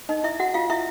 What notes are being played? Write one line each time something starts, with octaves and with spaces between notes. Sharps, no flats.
D#4 D#5
E4 E5
F#4 F#5
F4 F5
E4 E5